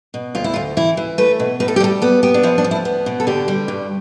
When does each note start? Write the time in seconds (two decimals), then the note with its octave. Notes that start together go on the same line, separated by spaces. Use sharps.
0.14 B2
0.35 D2 F4
0.44 E4
0.54 D2 F4
0.77 E3 E4
0.97 E3
1.18 A3 B4
1.40 B2
1.60 A2 B4
1.68 A4
1.76 G4
1.80 G3 A4
2.02 B3 A4
2.23 B3 G4
2.34 D4
2.43 F3 E4
2.58 D4
2.64 D2
2.71 E4
2.85 B3
3.06 B2
3.20 A4
3.27 D3 G4
3.48 G3
3.68 G2